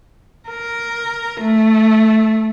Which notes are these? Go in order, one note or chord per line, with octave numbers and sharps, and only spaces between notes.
A#4
A3